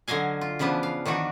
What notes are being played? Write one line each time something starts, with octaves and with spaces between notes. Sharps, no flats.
D3 F#3 D#5 F5 G#5
F4
C#3 E3 F3 B3 D4
F5
D#3 E3 D4 F#4